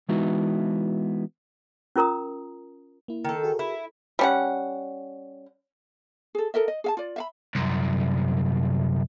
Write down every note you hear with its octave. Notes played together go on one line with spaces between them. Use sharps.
E3 G#3 B3 D#4 E4 F#4
C#4 F4 A#4 A#5 D#6
A#3 E4
D#3 A4
F#4 G#4 A#4
E4
G3 C#4 F#5
G#4 A4
A4 A#4 D#5 E5
D#5
G#4 F5 A5
F4 D5
E5 F5 B5
C2 F#2